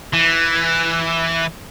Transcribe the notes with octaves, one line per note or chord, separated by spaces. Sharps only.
E3